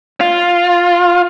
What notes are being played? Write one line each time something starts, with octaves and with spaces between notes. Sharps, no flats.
F4